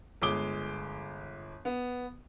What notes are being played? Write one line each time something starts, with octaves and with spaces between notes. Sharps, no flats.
G1 G#3 D6 G7
B3